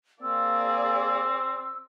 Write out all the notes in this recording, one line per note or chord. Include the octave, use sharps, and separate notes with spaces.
A#3 C4 G#4 D5 E6